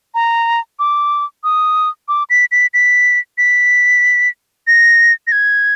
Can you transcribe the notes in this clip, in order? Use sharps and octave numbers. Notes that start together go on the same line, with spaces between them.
A#5
D6
D#6
D6
B6
B6
B6
B6
A#6
A#6
G#6